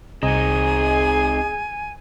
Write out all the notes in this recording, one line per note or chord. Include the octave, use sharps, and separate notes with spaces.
C2 C4 D#4 G#4 D#5 G#5 A#5